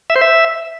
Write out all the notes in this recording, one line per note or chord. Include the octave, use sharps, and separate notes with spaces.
E5
C5
E5